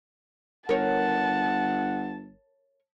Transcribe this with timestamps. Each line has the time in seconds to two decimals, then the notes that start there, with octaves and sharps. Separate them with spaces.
0.69 G1 A#4 C#5 F#5 A5